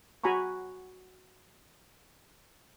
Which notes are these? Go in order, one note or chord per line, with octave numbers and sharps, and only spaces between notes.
F#4 G#5 A#5 B5 C#6